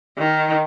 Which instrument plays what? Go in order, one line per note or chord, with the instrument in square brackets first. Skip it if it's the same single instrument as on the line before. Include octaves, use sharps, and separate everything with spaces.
[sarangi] D#3